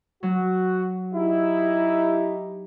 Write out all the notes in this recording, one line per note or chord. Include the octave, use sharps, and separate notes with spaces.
F#3 F#4
D#4 E4 G4